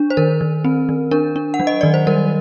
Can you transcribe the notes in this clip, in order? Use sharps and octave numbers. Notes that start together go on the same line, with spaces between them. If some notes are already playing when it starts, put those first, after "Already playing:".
Already playing: D4
C5
D#3 A#4
D#3
C4
D#3
D4 A#4
D4
F#5
F#3
D#5
D#3 D5
C5
G3 A#4